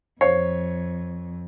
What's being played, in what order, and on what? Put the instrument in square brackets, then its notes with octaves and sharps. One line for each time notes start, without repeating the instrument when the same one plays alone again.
[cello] F2 [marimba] C5 [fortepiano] C#5